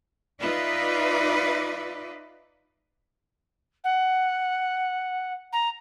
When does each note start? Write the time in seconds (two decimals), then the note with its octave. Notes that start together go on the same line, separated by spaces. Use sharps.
0.39 D#4 F4 B4 D5 E5
3.84 F#5
5.52 A#5